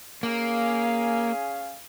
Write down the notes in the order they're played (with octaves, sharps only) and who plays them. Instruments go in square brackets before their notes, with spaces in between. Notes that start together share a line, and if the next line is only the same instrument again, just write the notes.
[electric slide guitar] A#3 [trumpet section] C#4 G#4 F5